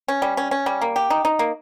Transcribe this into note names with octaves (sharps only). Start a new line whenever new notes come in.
C#4
G3
C#4
C#4
G3
A#3
G4
D#4
D#4
A#3